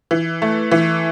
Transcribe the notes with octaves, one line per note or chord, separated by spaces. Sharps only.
E3
A3
E3